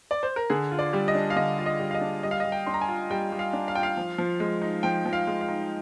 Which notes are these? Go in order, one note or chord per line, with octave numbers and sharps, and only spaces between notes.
D5
C5
A#4
D3 G#4
F4
D5
G3
D#5
D4
F5
D3 D#5
F4
D#5
G3
F5
D#5
D4
G3 D#5
F5
D#5
G3
G5
D4 C6
A#5
G#5
F4
G3 G5
G3
F5
D4
F5
F4 G5
F5
F3
F3
G#3
D#4
F3 G5
F3
F5
G#3
F5
D#4